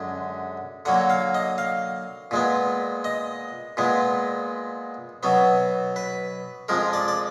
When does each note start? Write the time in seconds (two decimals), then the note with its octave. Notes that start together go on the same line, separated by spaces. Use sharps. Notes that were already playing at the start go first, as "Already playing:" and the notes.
Already playing: F#2 D3 G#3
0.85 D3 F#3 A#3 F#5
1.10 F5
1.35 D#5
1.58 F5
2.31 A#2 G#3 B3
3.04 D#5
3.77 A#2 G#3 B3
5.23 B2 F#3 B3
5.96 B4
6.68 F2 F3 G#3 A#4
6.93 D5
7.08 D5